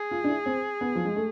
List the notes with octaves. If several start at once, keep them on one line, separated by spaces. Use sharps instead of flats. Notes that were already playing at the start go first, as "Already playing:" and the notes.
Already playing: G#4
F4
D4
E4
C4
B3
F3
G#3
A3